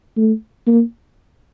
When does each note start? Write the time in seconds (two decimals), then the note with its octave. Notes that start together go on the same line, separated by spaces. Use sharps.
0.17 A3
0.66 A#3